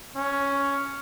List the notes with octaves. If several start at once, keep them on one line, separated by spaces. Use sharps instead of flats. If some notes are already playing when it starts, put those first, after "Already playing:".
C#4